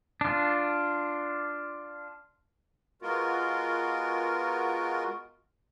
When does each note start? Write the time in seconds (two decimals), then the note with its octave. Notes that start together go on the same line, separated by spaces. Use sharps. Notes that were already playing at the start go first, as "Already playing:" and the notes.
0.21 D4 F4
3.02 G#3 B3 F4 F#4 A#4